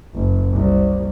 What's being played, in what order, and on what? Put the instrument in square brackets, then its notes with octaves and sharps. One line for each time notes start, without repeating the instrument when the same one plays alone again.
[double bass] F#1
C2